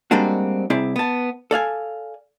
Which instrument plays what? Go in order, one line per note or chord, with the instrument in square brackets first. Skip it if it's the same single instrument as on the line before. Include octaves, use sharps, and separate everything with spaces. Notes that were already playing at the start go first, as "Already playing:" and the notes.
[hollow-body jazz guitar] G3 G#3 A#3 C4 D4 F#4
C2 C4 E4 G#4 D5
B3 A5
A4 D5 F5 G#5